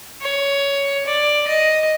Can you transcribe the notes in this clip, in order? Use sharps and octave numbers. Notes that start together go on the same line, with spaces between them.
C#5
D5
D#5